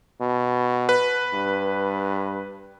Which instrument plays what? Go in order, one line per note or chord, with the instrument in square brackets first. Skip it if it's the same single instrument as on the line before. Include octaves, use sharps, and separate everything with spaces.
[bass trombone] B2
[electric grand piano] B4
[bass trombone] G2